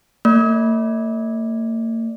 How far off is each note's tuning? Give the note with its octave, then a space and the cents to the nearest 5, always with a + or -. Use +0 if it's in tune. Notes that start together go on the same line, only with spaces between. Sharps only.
A#3 -45 D5 +0